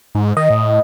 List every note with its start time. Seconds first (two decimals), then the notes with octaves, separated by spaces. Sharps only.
0.15 G#2
0.37 D#3 D#5
0.50 A2